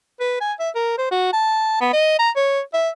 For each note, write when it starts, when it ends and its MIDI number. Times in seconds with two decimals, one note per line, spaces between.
0.20 0.36 71
0.41 0.52 80
0.59 0.70 76
0.75 0.96 70
0.98 1.09 72
1.11 1.31 66
1.33 1.79 81
1.81 1.90 59
1.93 2.18 75
2.19 2.30 82
2.36 2.60 73
2.73 2.89 76